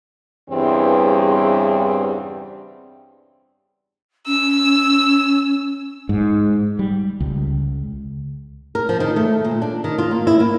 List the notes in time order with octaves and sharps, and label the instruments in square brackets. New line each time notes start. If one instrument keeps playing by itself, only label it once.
[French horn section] E2 G2 C#3 E3 G3 C4
[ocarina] C#4 [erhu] E6
[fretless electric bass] G#2
G3
C#2
[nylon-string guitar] A#4
F3
D#3
A3
A#2
D4
D#3
F4
A#3
E4
A#3